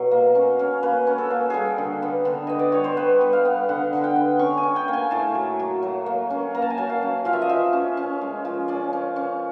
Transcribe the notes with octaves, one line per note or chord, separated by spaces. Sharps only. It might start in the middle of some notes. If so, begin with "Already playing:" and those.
Already playing: B2 F#3
A#3
C#4
C#4
A#3 B4
C#4
A4
A#3
G3 G#4 A4
D3
B3
D3
B3 D#5
D5
G3 C#5
C5
B3 B4
G3
F5
B3
D3 F#5
D3
G5
B3
C#4 C#6
G#5
C#4
G5
A#3
G#5
A2 A5
F#3
F#3
F#3
A#3
C#4
A#3 A#5
A5
G#5
F#3 A5
F5
C#4
F3 F5
E5
D#5
F3 E5
C#4
C#4
G#3
F3
C#4 D5
C#4
C#4